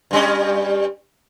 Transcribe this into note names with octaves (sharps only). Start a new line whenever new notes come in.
G2 G3 C#4